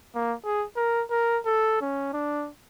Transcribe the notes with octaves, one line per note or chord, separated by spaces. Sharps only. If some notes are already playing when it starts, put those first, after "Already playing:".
A#3
G#4
A#4
A#4
A4
C#4
D4